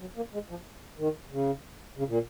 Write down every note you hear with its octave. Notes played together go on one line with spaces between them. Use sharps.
F#3
A#3
G#3
F3
D#3
C#3
C#3
A#2